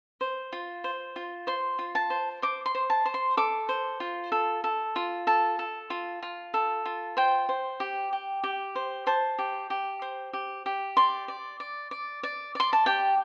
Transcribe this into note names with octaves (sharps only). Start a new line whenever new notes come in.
C5
F4
C5
F4
C5 C6
F4
A5
C5
C5 D6
C6
C5
A5
C5
C6
A4 D6
C5
F4
A4
A4
F4
A4 A5
A4
F4
F4
A4
F4
C5 G5
C5
G4
G4
G4
C5
C5 A5
G4
G4
C5
G4
G4
D5 C6
D5
D5
D5
D5
D5 C6
A5
G4 G5